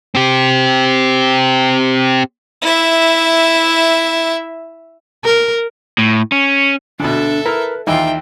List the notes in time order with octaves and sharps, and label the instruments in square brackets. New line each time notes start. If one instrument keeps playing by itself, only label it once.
[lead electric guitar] C4 G4
[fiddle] E4 E5
[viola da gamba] A#4
[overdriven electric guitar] A2
C#4
[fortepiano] D2 B2 [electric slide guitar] D4 [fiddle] A4 E5
[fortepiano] E4 [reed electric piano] A#4 F6 [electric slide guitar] B4
[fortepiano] D#2 E3 [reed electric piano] D#4 [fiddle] F4 G5 [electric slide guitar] E5